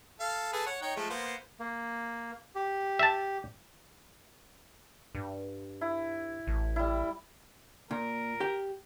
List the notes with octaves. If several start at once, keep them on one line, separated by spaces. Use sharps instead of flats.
A4 F5
G#4 A4 B4
C#5 F#5
D#4 C#5 G5
F3 G#3 A3
A#3 B3 C5
A#3
G4
E5 A5
G2
E4
A1
G3 E4
A#2 A#4
G4 G5